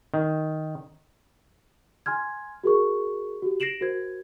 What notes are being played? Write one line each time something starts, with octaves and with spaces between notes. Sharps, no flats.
D#3
G#5 C6 F6 G#6
F#4 G#4 A#4 C#6
F#4 G4
A#6 C7 D7 E7 F#7
F#4 A#4 C5 G#6